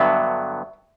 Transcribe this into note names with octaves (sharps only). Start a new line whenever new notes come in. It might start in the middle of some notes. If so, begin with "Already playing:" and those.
Already playing: G2 D3 F#3 B3 E5